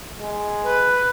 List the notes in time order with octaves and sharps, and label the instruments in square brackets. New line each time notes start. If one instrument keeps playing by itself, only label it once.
[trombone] G#3
[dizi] B4